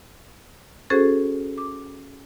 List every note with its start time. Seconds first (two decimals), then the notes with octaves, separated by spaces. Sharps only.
0.90 C#4 F#4 G#4 A4 C5
1.58 D6